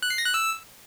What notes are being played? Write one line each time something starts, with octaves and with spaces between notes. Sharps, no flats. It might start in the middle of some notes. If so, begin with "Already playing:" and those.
F#6
C7
A#6
F#6
E6